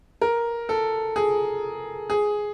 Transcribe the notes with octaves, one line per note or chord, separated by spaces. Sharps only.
A#4
A4
G#4
G#4